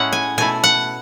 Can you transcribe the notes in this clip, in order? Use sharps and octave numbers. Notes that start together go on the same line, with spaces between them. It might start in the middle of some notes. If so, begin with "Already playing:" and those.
Already playing: A2 G#3 C#4 E4 F#5
G#5
B2 A3 E4 G#5
F#5